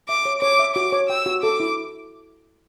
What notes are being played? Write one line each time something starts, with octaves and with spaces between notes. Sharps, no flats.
E5 D6
C#5
C#5 D6
E5
F#4 D6
C#5
G5 E6
F#4
A4 D6
E4